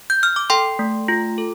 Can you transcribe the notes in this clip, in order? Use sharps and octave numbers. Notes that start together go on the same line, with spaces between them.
G6
F6
D6
A4 G5 C6
A3
F4
A4